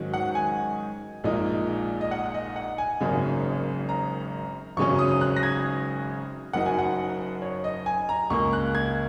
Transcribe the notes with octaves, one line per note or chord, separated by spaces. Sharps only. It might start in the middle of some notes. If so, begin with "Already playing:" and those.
Already playing: G#2 D#3 F#3 C#4
F#5
G#5
A#1 A#2 G#3 D#4
D#5
F#5
D#5
F#5
G#5
G#1 F#2 C#3 A#3 D#4
A#5
G#1 F#2 C#3 F#3 C#4 C#6
D#6
D#6
F#6
A#6
G#6
F#1 F#2 F#3 D#4 F#5
G#5
F#5
C#5
D#5
G#5
A#5
C#2 C#3 A#3 C#6
F#6
G#6